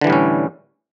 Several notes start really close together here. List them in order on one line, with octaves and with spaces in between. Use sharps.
D3 E3 G3 A2 C#4